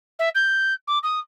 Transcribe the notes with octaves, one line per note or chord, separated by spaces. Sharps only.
E5
G6
D6
D#6